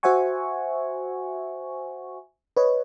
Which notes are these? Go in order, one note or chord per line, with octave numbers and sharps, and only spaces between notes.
F#4 C5 E5 F#5 G#5 C#6
B4 C#5 D#5